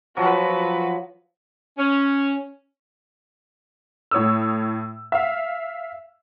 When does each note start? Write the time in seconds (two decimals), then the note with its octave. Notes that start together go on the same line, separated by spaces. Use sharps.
0.17 F3 F#3 F#4 B4
1.78 C#4
4.11 A2 C#5 D#6 E6
5.12 E5 F5